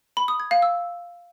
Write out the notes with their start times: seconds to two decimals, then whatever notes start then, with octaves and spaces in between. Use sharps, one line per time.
0.17 B5
0.28 D#6
0.40 G#6
0.51 F5
0.62 E6